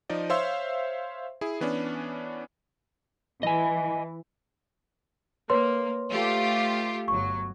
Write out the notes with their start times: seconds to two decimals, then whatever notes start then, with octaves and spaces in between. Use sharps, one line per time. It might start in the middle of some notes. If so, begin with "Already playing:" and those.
0.09 F3 D#4 D5 D#5
0.30 C5 C#5 E5 F5 C6 E6
1.41 E4 G#4
1.61 E3 B3 C#4 D4
3.43 E3 D#5 G#5
5.50 A#3 B4 C#5 C6
6.09 A3 F4 G4
7.08 G1 F#3 C#6